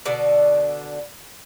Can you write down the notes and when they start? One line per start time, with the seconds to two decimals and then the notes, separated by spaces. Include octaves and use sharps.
0.05 B2 D3 D5